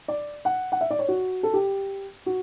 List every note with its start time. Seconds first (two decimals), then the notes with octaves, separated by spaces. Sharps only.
0.08 D5
0.45 F#5
0.72 F#5
0.81 E5
0.90 D5
0.99 C#5
1.08 F#4
1.43 A4
1.53 G4
2.26 F#4